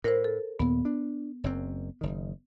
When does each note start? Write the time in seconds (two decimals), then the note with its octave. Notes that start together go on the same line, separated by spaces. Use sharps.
0.04 A2 A#4 C5
0.24 A4
0.59 D#2 A#2 B3
0.85 D4
1.44 F#1 F#2 C4
2.01 F#1 D#3